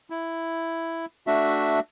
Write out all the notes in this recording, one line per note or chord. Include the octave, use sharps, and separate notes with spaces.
E4
A3 D4 F#4 E5